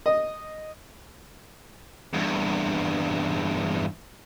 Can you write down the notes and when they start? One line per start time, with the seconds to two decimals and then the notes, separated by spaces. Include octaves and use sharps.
0.06 D#5
2.14 E2 G2